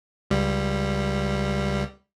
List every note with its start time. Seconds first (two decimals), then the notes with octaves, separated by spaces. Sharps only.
0.31 C#2 G3